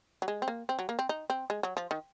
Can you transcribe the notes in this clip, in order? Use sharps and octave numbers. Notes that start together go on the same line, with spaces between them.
F#3
G#3
C4
A#3
C4
F#3
A#3
C4
D#4
C4
G#3
F#3
F3
D#3